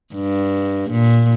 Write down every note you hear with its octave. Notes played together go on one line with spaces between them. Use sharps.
G2
A#2